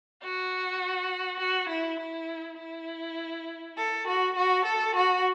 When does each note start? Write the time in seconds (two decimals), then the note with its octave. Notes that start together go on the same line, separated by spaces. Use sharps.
0.22 F#4
1.40 F#4
1.70 E4
1.99 E4
2.59 E4
3.77 A4
4.07 F#4
4.36 F#4
4.65 A4
4.95 F#4